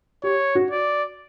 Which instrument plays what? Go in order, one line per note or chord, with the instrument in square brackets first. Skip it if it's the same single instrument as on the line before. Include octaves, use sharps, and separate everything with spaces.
[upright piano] G4 [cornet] C#5
[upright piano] F#4
[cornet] D5